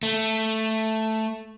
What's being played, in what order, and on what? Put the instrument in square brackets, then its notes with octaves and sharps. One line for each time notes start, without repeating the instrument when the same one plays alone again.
[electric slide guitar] A3